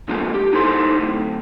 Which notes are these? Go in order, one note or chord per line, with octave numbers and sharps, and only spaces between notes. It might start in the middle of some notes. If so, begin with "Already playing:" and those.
A#2 D3 F3 G#3 A#3
G4
D#4 E4 A4 C5 C6
D2 A2